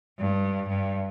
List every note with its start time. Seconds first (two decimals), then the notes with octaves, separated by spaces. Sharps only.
0.19 G2
0.69 G2